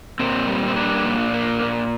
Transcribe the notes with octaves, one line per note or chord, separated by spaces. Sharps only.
A#2 C4
G3
C4
A#3 D4
A#2
A#3
A#2